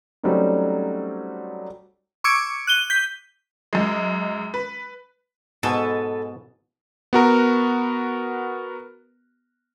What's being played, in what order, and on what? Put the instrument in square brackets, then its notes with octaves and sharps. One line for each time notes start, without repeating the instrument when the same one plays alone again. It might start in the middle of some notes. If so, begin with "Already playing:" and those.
[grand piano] F#3 G3 A3 C4 C#4 D#4
[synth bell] C#6 D6 E6 G#6 C#7 D7
F#6 D#7 G7
G6 B6
[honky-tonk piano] F#2 G#3
B4
[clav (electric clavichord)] G#2 B2 [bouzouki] A4 B4 G#5
[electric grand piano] B3 F#4 A#4